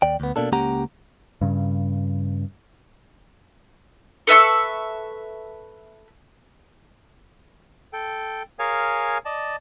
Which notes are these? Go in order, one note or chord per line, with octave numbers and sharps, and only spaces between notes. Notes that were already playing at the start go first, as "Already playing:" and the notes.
D#2 D5 G5
D2 B3
B2 A#3 D4 A4
C#2 A#3 C#4 G4 F#5 A#5
G2 C#3
A4 B4 E5 C#6
A4 G5
G#4 A#4 C#5 F5 G#5
D5 D#5 A5